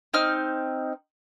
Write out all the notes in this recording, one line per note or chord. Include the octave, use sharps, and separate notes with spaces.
C4 D#4 F6